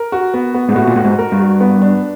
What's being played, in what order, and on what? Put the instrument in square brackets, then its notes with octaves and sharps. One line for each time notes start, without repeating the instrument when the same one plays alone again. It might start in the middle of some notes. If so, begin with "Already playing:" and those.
Already playing: [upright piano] A#4
F#4
B3
B3
[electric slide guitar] G#2
[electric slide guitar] A2 [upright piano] F#4
[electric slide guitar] A#2
[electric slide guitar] A2 [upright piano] F#4
[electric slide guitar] G#2
[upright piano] A#4
[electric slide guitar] G2
[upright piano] F#4
B3
D4